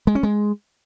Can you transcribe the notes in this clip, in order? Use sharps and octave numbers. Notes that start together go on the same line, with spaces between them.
G#3
C#4
G#3